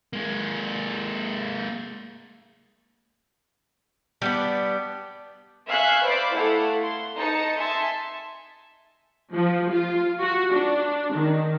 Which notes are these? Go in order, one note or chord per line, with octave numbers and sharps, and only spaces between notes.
G#3 A#3
G3 B3 D4
E5 F5 G#5 C#6 F#6
B4 C5 D5 F5 B5 D6
A3 E4 A4 F5 F#5
C6
D#4 A5 C#7
E5 G#5 A5 C6
F3
F4
F#4
D4
D#3